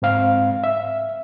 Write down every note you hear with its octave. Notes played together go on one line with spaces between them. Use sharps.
G#2 C4 F5
E5